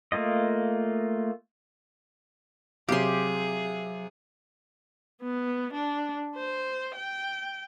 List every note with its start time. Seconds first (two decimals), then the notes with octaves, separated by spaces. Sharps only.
0.12 A3 A#3 F4 D#5
2.89 C3 F#3 G4 G#4 F5 C6
5.22 B3
5.74 D4
6.36 C5
6.95 G5